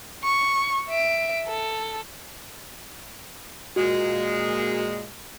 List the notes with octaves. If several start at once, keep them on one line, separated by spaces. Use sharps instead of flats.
C#6
E5 D7
A4
A#2 G#3 F#4